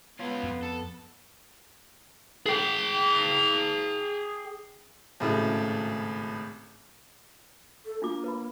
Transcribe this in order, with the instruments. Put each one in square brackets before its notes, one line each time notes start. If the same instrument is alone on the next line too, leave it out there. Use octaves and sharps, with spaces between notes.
[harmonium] B3 [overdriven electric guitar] C#4 F4
[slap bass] F2
[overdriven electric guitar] A4
G#4 G5
[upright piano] G#1 A2 C#3
[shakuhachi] A4
[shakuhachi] A#3 [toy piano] D4 F4 D6
[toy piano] B4 B5